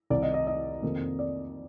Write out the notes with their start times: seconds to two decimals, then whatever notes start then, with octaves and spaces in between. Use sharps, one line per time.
0.10 C2 C3 D#3 D5
0.22 D#5
0.34 D#5
0.47 D#5
0.83 F2 C3 D#3 A#3
1.19 D5